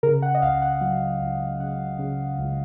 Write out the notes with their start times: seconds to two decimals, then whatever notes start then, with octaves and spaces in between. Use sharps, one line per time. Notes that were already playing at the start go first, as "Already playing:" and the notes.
0.03 C#3 A#4
0.22 F#5
0.34 D#5
0.42 C#2 F5
0.62 F#5
0.81 F#3 F#5
1.21 C#2
1.59 C#3 F#5
1.99 C#3
2.38 C#2